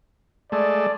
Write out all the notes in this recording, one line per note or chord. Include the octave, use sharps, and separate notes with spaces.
G#3 A3 D5